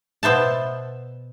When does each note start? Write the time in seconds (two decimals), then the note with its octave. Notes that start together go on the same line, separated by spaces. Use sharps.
0.23 B2 B3 C5 E5 A5